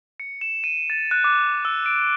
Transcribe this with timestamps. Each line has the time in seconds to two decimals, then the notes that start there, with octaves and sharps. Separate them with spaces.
0.20 C#7
0.41 E7
0.64 D#7
0.90 A6
1.11 F#6
1.24 D6
1.65 E6
1.86 D7